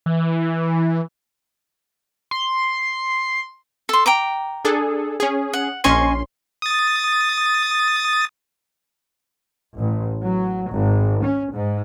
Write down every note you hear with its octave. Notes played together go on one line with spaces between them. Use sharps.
E3
C6
A4 C6
G5 A#5 D6
D4 G#4 A4
C#4 G#4
F#5
A#1 C#4 D#5 G#5 C6 C#6
D#6 A6
A1
F#3
G#1
C#4
G#2